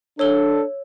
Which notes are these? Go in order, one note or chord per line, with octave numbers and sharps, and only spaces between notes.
D4 A4 C#5 E6 G7